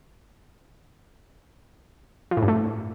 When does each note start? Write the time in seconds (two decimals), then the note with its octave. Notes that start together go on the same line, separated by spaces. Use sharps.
2.31 F3
2.37 A2
2.42 G2
2.48 A3